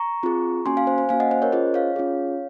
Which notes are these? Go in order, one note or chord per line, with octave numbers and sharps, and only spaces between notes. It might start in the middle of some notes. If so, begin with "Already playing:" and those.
Already playing: A#5 C#6
C4 F4 G#4
A#3 C#4 F#4 G#5 C6
F5 G#5
C5
C5
A#3 C#4 F#4 F5 G#5
D#5 F#5
C5
A#4 C#5
C#4 F4 G#4 C5 D#5
C#5 F5
C#4 F4 G#4